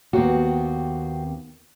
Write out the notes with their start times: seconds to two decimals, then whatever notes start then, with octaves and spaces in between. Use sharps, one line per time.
0.13 D#2 B3 C4 F#4